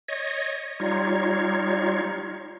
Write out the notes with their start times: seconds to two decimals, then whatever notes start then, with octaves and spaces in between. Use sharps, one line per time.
0.08 C#5 D#5
0.80 G3 D#4 F4 C#5